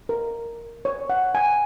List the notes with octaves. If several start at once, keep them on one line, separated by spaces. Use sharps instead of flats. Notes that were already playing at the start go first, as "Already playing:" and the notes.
A#4
C#5
F#5
G#5